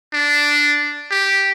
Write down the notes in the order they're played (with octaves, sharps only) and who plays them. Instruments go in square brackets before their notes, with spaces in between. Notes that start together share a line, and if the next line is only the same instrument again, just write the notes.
[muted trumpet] D4
G4